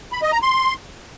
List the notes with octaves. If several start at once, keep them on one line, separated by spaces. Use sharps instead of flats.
B5
D#5
A#5
C6